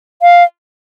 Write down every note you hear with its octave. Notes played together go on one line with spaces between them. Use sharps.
F5